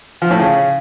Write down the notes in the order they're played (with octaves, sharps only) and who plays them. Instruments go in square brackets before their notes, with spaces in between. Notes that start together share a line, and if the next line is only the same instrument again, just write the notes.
[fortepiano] F3
A2
C#3